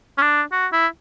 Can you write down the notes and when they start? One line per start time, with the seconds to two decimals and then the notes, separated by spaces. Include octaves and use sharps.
0.18 C#4
0.21 D4
0.52 F#4
0.73 E4